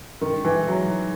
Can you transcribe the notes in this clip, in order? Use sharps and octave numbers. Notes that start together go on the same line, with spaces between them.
D#3
E3
F#3